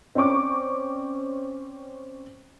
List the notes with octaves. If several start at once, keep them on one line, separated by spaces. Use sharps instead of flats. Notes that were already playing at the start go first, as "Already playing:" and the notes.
C4 C#4 D5 C#6 D6